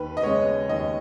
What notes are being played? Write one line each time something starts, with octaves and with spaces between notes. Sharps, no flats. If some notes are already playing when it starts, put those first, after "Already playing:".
Already playing: D#2 B4
D#5
C#3 G#3 B3 C#5
D#2 D#5